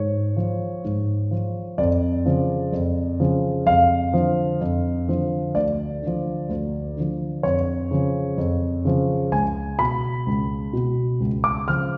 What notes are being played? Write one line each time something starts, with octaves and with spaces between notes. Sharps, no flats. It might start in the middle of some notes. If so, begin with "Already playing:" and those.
Already playing: G#2 C#5
F3
G#2
F3
F2 D5
C#3 F3
F2
C#3 F3
F2 F5
D3 F3
F2
D3 F3
D2 D5
D3 F3
D2
D3 F3
F2 C#5
C#3 F3
F2
C#3 F3
C#2 G#5
B2 B5
C#2
B2
C#2
D6
C#3 F3 F6